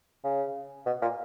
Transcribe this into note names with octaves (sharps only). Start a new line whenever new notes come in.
C#3
B2
A#2